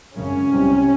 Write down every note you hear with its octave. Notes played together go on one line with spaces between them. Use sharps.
G#1 F#2 C#3 C#4
C2 C3